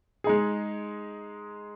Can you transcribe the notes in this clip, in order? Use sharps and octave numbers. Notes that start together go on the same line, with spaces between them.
G#3 D#4 G#4